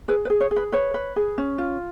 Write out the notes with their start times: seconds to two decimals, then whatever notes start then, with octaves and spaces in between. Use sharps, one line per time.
0.08 G#4 B4
0.25 B4
0.30 G#4
0.40 C#5
0.51 G#4
0.56 B4
0.72 B4 C#5
0.94 B4
1.16 G#4
1.38 C#4
1.58 F4